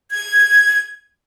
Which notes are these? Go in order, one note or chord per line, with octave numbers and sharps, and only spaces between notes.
G#6